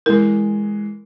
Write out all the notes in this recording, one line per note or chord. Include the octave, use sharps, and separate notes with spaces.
E3 G#3 A#4